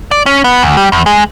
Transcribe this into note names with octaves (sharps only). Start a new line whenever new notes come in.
D5
C#4
B3
D2
G3
E2
G#3